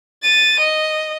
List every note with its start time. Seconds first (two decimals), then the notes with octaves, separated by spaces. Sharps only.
0.23 A6 D#7
0.60 D#5